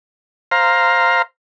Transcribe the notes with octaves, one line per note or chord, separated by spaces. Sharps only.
C5 F5 A#5